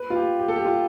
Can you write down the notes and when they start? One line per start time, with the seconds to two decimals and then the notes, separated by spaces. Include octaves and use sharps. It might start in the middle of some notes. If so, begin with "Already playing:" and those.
Already playing: B4
0.10 F4
0.15 G4
0.39 G4
0.48 A4
0.56 G4
0.65 F4